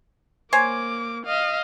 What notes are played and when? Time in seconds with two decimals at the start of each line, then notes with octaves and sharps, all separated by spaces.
0.53 A#3 C5 C#5 G#5 D6
1.26 D#5 F5